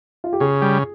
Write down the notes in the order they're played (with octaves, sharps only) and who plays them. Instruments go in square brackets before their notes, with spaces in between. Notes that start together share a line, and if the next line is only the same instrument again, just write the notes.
[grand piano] F4
G4
[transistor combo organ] C#3 [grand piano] G#4
[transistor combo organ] G3